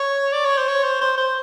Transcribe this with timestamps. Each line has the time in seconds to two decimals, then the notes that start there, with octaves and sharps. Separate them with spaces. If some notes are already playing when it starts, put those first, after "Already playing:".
Already playing: C#5
0.32 D5
0.45 C#5
0.57 C5
0.68 C#5
0.83 C5
1.01 C5
1.18 C5